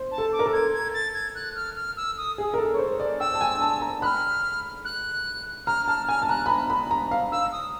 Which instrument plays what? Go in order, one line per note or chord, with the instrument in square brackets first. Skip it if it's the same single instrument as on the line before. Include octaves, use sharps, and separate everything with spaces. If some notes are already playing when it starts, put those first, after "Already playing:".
Already playing: [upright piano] C5
[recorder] A5
[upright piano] A4
[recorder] D6
[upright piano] A#4
A4
[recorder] G#6
G#6
A6
G#6
F#6
F6
F6
E6
D#6
[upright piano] G#4
A#4
A4
C#5
C5
D5
[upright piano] G5 [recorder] E6
[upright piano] A5
G#5
A5
A#5
[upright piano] B5 [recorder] F#6
[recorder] F6
F#6
[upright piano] A#5 [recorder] F6
[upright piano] A5 [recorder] F6
[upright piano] G#5 [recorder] F6
[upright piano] A5
[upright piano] A#5 [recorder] F#6
[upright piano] B5
A#5
B5
A#5
F5
[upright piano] F5 [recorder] E6
[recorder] D#6